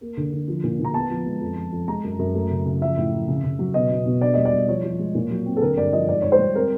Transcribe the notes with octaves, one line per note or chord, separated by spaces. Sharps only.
A#3
D3
D3
F3
A#2
A#2
A#5
B3 A5
F3
G#3
F2
F2
F2
G#3 A#5
F#2
F#2
A3
C#3
C#3
F3 E5
A2
F3
C#3
C#3
F#3
B2 D#5
B2
B2
D4 D5
G3 D#5
D5
G3
F3 C#5
F3
G#3
A#2
F#3
C4
A4
D3 A#4
G2 D5
F3 D#5
G#2 D5
G#2 C#5
C5
G3
C4 A#4